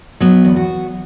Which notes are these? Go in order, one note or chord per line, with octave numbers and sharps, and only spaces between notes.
F#3 B3
E2
F#4